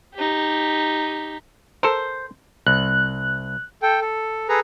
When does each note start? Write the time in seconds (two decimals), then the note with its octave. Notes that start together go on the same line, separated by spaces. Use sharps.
0.15 D#4 G4
1.83 A4 A#4 C5
2.67 C2 F#6
3.83 A4 G5
4.01 A4
4.49 G#4 A4 B4 A#5